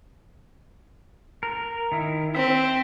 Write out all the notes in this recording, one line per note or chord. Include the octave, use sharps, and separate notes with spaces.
A#4
D#3 E4
C4 E5